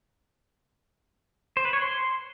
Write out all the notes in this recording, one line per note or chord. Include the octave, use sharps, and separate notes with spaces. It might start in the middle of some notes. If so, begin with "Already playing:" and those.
C5
B4
C#5
C6